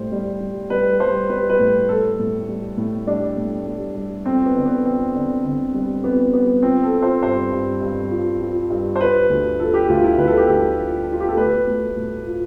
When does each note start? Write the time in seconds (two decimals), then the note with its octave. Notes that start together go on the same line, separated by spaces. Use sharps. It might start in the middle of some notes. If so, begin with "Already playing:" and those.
Already playing: A2 G3 C5
0.12 G3
0.41 G3
0.70 G3 B4
1.00 G3 C5
1.30 G3 B4
1.49 B4
1.59 A2
1.89 G3 A4
2.19 A2
2.49 G3
2.77 A2
3.07 G3 D4
3.37 A2
3.67 G3
3.96 G3
4.25 F2 C4
4.46 B3
4.56 D3
4.66 B3
4.85 F2 C4
5.15 D3
5.45 D3
5.74 G3
6.04 F2 B3
6.33 G3 B3
6.62 F3 C4
6.83 A4
6.93 F3
7.02 C5
7.22 G2 C5
7.53 G2
7.81 G2
8.11 F3
8.41 F3
8.70 G2
8.95 C5
9.00 F3 B4
9.30 D2
9.59 F3 A4
9.74 G4
9.89 D2 F4
10.04 E4
10.18 D2 B4
10.27 A4
10.37 G4
10.47 D2 A4
10.78 F3
11.08 F3 F4
11.20 G4
11.28 A4
11.37 A3 B4
11.67 A3
11.96 A2
12.26 F3